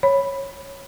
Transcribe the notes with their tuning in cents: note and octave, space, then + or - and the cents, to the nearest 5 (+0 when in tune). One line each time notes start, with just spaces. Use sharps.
C#5 -10 B5 +0